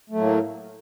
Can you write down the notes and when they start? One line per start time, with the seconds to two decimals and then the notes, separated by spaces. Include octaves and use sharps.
0.10 A3
0.13 F#3
0.16 A2
0.19 A#3